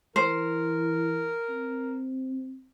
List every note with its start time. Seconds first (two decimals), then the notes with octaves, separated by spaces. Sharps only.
0.16 E3 A#4 C5
1.49 C4